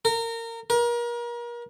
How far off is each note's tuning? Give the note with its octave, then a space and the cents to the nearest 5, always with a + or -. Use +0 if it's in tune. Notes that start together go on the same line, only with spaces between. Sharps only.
A#4 -25
A#4 +35